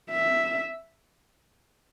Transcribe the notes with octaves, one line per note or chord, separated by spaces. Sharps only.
E5